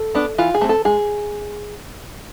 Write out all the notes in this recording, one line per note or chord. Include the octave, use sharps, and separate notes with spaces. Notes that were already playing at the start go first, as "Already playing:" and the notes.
Already playing: A4
B3 D4
E3 F4
G#4
A3 C4
A4
G#3 G#4